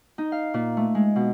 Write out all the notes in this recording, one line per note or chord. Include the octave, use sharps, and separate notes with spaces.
D#4
F5
A#2
A3
G#3
B2